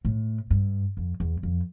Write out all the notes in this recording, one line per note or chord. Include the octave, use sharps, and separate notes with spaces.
A2
G2
F2
E2
F2